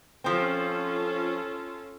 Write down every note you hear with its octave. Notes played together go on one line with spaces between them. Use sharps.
F3 C4 C#4 F4 A4